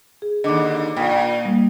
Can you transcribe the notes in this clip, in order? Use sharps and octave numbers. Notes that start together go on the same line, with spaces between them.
G#4
D#2 D3 D#5 D6
A#2 G5
G3 A#3